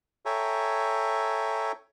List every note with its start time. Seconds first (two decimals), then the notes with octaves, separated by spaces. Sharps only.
0.26 A4 C#5 E5 G5 G#5 A#5